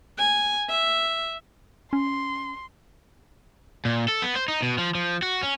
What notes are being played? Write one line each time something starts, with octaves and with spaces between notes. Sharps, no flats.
G#5
E5
C#4 C6
A#2
A4
B3
C5
D#4
B2
F3
F3
F#4
C#4